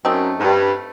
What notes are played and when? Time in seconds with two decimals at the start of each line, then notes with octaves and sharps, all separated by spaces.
0.05 F#2 A3 C4 D#4
0.39 G#2
0.44 G2